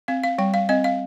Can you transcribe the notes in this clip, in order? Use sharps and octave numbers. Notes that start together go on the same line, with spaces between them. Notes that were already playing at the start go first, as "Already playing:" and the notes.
C4 F5
F5
G3 G5
F5
C4 D#5
F5